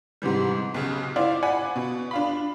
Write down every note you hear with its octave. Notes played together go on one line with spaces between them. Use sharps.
G#2 C3 E3 G3
B1 C#3
E4 F4 C5 D5
D5 F#5 G#5 B5
B2
D4 F4 B5